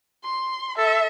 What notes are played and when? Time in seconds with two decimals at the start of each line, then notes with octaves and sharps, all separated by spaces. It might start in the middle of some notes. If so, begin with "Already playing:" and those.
0.24 C6
0.78 A4 E5